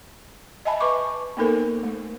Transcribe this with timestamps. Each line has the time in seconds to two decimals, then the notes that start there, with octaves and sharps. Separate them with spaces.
0.65 D#5 E5 G#5 A5 B5
0.80 B4 D#5 C#6 D6
1.37 A#3 B3 D#4 A4 A#4 C5
1.83 A3